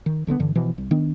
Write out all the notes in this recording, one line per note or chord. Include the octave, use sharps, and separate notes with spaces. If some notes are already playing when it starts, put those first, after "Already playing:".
D#3
C2 D3 G3 B3
G2 D3 E3
B2 E3 F3
C2
D#3 B3 D4